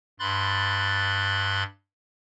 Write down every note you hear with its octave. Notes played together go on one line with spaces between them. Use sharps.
G2 B5 C6 F#6 A6